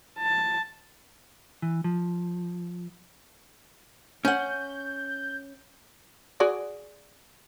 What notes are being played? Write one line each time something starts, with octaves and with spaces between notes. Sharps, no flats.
A5
E3
F3
C#4 F#5 G6
F#4 G#4 D5